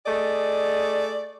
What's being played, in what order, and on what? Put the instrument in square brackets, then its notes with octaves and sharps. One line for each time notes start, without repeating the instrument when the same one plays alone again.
[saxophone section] A3 G#4 D#5 [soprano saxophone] D5